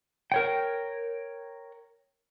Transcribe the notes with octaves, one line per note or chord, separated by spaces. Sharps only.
A#4 C#5 G5